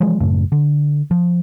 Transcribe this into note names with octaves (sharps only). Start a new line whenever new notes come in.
E3 F3 G#3
F#2 A2 C#3 A3
D3
F3